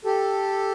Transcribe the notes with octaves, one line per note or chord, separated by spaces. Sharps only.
G4 A4